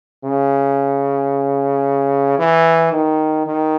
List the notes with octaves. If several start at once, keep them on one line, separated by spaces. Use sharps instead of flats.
C#3
E3
D#3
D#3